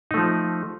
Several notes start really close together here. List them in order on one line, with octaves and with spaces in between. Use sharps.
D#4 A3 F3